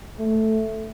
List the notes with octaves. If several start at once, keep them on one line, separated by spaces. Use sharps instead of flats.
A3